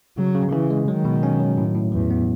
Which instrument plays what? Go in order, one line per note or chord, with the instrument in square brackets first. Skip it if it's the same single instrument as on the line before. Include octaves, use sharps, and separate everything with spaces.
[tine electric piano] C#3 [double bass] F#3
[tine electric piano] C#3
[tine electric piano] C#3 [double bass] E3
[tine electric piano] G#3
[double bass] D#3 [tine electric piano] F#3
[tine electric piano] B2
C#4
F#3
A2
A2
[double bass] E2 [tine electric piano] E3
[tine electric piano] B3